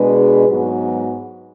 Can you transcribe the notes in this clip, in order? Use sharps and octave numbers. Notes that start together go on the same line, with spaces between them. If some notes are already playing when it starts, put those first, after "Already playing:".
Already playing: B2 G#3 D4 G#4 B4
G#2 F#3 B3 F#4